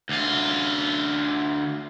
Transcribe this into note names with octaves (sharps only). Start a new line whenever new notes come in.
D2 F4